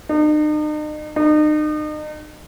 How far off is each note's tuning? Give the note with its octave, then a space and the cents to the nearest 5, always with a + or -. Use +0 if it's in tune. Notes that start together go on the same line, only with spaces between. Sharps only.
D#4 -45
D#4 -40